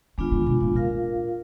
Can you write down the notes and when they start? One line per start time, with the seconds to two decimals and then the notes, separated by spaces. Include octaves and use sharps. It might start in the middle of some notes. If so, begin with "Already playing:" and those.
0.18 D#3 G#3 B3 D4 F4
0.32 D3
0.46 B2
0.60 A#2
0.75 A#2 F4 A#4 F5